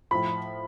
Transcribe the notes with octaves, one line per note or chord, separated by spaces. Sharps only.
A2 F3 B5